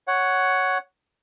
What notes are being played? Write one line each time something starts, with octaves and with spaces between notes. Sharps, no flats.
C#5 F#5